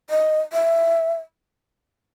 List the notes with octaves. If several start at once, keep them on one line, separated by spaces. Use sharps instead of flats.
D#5
E5